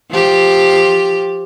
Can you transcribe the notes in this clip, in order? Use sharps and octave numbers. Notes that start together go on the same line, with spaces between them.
F3 G4